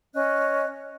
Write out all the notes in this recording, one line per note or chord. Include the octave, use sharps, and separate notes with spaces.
C#4 D#5 F#6